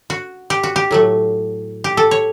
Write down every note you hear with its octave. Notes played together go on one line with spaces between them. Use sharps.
F#4
G4
F#4
G4
A2 F#3 A3
G4
A4
C#5